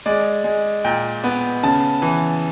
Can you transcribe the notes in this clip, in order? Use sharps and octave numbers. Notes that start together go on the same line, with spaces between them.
G#3 D5
G#3
A#2 G5
B3
C#3 A5
E3